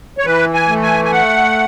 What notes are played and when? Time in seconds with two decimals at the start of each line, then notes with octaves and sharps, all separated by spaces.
0.18 C#5
0.25 E3 B4
0.54 G#5
0.68 A3
0.83 G#5
1.05 G#5
1.12 F#5